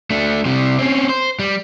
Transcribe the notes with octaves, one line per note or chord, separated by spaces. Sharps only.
A3 D4
C3 G3
C4 C#4
C5
G3